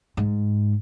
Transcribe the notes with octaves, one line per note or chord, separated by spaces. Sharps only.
G#2